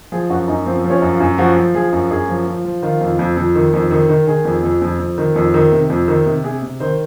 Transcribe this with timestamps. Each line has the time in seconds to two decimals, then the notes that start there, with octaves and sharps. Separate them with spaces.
0.12 F3 G#4
0.30 F#2 F#4
0.48 F#2 D#4
0.66 F3 C4
0.84 F3
0.90 C#4
1.02 F#2
1.14 F4
1.20 F#2
1.38 F3 F#4
1.56 F3
1.74 F3 G#4
1.93 F#2
2.11 F#2 G#4
2.28 F3
2.47 F3
2.65 F3
2.83 D#3 F4
3.01 F2
3.19 F2
3.37 F2
3.55 D#3
3.73 F2
3.91 D#3
4.09 D#3
4.27 D#3 G#4
4.45 F2
4.63 F2
4.82 F2
4.99 F2
5.18 D#3
5.36 F2
5.54 D#3
5.72 C3
5.90 F2
6.08 D#3
6.26 C3
6.44 C3 G#4
6.62 C3
6.80 D#3 C5